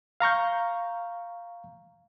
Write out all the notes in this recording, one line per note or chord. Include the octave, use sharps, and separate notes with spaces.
F5 A#5 C#6 G6